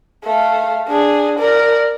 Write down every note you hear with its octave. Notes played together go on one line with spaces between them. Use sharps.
A3 F5
D4 G#4
A#4 D5